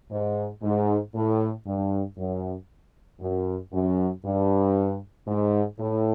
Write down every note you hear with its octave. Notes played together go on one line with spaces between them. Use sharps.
G#2
G#2
A2
G2
F#2
F#2
F#2
G2
G#2
A2